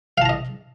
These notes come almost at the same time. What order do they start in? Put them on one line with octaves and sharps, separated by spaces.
F5 A5 A#5 D#5